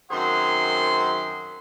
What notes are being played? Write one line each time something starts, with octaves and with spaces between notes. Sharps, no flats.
F#2 D#3 C4 G#4 F#5 C6